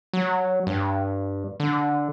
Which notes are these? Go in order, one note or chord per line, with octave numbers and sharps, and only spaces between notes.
F#3
G2
D3